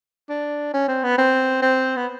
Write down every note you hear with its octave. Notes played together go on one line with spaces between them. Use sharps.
D4
C#4
C4
B3
C4
C4
B3